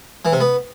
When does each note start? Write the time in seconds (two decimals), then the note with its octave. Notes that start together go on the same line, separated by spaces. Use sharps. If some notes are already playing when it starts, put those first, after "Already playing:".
0.25 E3
0.33 C3
0.40 B3